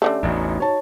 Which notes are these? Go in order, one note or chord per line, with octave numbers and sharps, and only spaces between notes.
D3 E3 A3 C#4 G4
A1 E2 D#4 F#4
C#5 A5